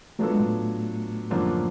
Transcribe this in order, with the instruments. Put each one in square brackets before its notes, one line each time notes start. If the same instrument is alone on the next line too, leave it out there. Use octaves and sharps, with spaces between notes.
[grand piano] F#3 B3 D4 F4 A4 [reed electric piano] A3
[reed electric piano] G#3
A2 A3
[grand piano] F#2 D3 F3 A#3 D4